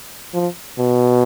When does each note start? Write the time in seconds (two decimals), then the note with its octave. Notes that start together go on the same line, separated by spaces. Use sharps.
0.34 F3
0.78 B2